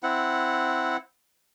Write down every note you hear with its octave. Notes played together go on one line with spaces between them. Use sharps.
C4 E4 F#5